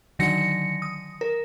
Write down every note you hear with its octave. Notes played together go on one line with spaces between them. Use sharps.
D3 D#3 F#3 A#6 C#7
D#6
A#4